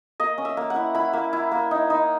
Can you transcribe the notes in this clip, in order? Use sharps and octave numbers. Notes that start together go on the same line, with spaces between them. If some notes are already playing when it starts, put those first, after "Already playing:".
A#3 D#5
C#4
E5
A#3
F#5
E4
E4 B5
A#3
E4
A#3
D#4
D#4